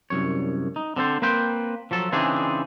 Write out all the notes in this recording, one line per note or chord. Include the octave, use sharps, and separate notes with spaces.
C2 F#2 C#5
D#4
D3 C4 A4 C5
A#3 C4 B4 C5 G5
F3 F#3 A4
C#3 E3 C4 D4 D#4 G#4